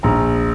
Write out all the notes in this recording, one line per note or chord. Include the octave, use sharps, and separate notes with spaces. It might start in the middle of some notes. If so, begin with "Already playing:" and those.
A#1 A#5